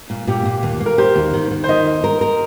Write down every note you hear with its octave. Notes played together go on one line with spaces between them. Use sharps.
A#2
A#2 G4
A#2
D#2
A#3
A#4
G4 C5
D#2
D#3
D#3
C5
D#3 D#5
D#2
A#4
A#4